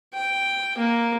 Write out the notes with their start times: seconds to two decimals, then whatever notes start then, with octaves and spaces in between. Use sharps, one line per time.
0.14 G5
0.77 A#3